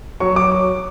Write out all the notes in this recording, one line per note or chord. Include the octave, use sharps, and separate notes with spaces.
F#3 C#6
F#3 D6